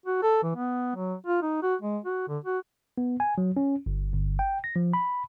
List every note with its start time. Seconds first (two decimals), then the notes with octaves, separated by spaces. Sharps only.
0.06 F#4
0.22 A4
0.43 E3
0.56 B3
0.96 F#3
1.27 F4
1.42 D#4
1.63 F#4
1.82 G#3
2.04 F#4
2.29 D3
2.44 F#4
2.98 B3
3.20 G#5
3.38 F#3
3.57 C#4
3.86 G1
4.14 G1
4.39 G5
4.64 A#6
4.76 F3
4.93 B5